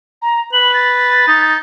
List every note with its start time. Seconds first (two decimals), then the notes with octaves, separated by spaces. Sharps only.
0.22 A#5
0.53 B4 F#7
0.74 A6
1.27 D#4